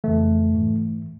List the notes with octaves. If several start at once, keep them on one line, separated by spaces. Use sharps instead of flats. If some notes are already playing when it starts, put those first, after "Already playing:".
F2 C#3 E3 A3
G#2 E3